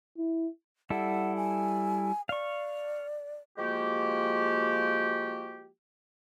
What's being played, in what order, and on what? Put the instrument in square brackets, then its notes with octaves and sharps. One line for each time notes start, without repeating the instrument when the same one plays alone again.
[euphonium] E4
[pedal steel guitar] G3 E4 A4 [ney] F#5
[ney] G#5
[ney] D5 [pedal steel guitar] F5 C#6
[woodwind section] F3 G#3 A#3 F#4 G4